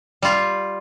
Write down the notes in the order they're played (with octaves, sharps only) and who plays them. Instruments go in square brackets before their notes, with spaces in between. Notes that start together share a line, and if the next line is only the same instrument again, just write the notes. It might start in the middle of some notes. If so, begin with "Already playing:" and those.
[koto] G3 F4